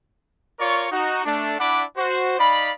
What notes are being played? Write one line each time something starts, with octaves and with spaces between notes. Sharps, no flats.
F4 A#4 C#5 D5 C#6
D#4 F#4
A3 D4
D4 E4 D5 F#5 B5 D6
F#4 C5
D#4 D5 F5 B5